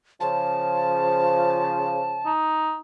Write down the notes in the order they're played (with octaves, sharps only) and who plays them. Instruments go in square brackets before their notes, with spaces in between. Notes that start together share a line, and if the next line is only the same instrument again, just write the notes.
[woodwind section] C#3 F3 [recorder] A5
[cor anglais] D#4